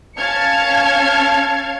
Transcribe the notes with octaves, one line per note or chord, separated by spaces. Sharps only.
C#4 F5 A5 F6 G#6 C#7